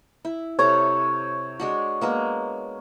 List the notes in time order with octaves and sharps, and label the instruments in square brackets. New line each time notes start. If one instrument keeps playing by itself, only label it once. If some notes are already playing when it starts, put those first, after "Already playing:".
[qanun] E4
[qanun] C3 A4 A#5 [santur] C#5
[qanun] G#3 D4 F#4
G#3 A#3 B3